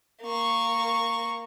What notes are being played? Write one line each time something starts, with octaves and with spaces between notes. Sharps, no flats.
A#3 C#6